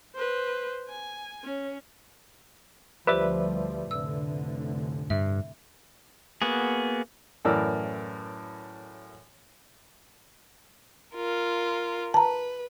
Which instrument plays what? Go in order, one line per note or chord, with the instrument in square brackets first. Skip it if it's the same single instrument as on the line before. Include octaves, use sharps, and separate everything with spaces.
[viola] B4 C5
G#5
C#4
[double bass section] D2 F3 G3 [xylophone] G4 C5 [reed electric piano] B4 D5 E5
[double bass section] F1 A2 D3 [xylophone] E6
[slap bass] G2 [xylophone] E5
[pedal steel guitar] A#3 B3 F#4 G#4
[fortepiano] F#2 A2 E3 A#4 D5 E6
[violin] F4 A#4
[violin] B4 [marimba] A5 A#5